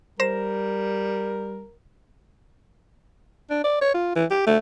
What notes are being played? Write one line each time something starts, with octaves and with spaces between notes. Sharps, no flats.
G3 A#4 C5 A#6 E7
D4
D5
C#5
F4
E3
G4
A3